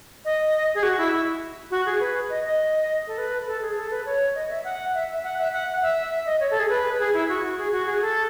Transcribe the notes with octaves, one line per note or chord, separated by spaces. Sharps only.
D#5
G#4
F#4
E4
E4
F#4
G#4
B4
D#5
D#5
A4
B4
A4
G#4
A4
B4
C#5
D#5
E5
F#5
E5
E5
F#5
E5
F#5
E5
E5
D#5
C#5
A4
G#4
B4
G#4
E4
F#4
G#4
F#4
G#4
A4